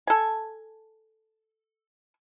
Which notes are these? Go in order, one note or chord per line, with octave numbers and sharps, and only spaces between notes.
A4 G#5